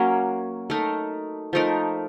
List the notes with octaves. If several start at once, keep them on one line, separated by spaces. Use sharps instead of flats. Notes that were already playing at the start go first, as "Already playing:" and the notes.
Already playing: F#3 A#3 C#4
A3 D#4 A#4
F3 A3 D#4 A#4